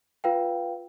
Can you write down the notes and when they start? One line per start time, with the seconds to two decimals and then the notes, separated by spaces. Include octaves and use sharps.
0.24 F4 B4 F5 G5